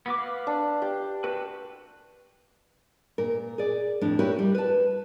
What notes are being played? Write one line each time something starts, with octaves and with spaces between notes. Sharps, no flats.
B3 F#4 D6
B4 F5
D4
G4 D5
F#4 B4 E6
A#2 A#4
G#4 D5
F2 A2 D4
E4 F#4 G4 A#4 B4 C#5
G3
B4 A5